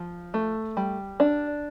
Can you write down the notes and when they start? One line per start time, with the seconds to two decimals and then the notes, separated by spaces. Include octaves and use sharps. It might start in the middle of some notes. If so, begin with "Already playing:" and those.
Already playing: F3
0.34 A3
0.77 G3
1.20 D4